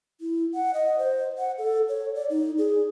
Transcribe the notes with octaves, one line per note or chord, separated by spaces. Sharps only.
E4
F#5
D#5
C5
F#5
A4
C#5
D5
D#4
G#4